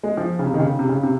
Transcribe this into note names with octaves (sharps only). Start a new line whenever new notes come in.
G#3
F3
C#3
C3
D#3
C#3
C3
C#3
C3